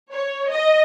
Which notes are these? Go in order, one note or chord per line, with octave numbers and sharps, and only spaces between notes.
C#5
D#5